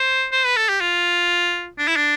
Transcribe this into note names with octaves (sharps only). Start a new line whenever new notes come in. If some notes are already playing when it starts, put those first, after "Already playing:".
Already playing: C5
C5
B4
A4
G4
F4
D4
E4
D4